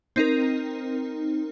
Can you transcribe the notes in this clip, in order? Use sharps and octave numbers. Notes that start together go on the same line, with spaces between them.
C4 D#4 A#4